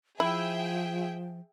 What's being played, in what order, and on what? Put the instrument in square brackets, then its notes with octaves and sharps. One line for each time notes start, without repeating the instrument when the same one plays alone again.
[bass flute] F3 [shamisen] E4 [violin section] G#4 E5 G5